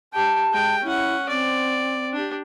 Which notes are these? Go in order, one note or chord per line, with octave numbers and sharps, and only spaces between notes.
G4 G5 A5
G#3 G5
C#4 E4 F#5
C4 D5
D4 G4